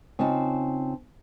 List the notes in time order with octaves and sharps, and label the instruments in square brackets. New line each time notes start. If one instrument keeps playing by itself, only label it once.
[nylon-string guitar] C#3 C4 D#4 F4 A5